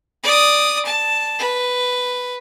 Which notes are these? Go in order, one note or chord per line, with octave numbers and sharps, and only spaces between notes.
D5 D#6
A5
B4